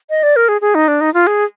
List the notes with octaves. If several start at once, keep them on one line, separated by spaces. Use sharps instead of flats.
D#5
D5
A#4
G#4
G#4
D#4
D4
D#4
F4
G#4